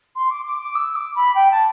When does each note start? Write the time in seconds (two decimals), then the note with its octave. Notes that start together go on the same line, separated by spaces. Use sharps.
0.15 C6
0.31 D6
0.45 D6
0.60 D6
0.75 E6
0.96 D6
1.15 B5
1.35 G5
1.51 A5